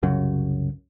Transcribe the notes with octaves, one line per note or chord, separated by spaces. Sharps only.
C2 F#2 C#3 F#3